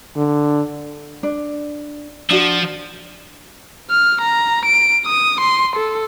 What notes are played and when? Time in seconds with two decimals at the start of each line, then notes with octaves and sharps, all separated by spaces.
0.17 D3
1.23 D4
2.30 F3 D4 F#4
3.90 F6
4.21 A#5
4.65 D7
5.06 D#6
5.40 C6
5.76 A4